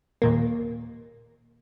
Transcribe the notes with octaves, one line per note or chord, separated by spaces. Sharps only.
D#2 A#2 A#3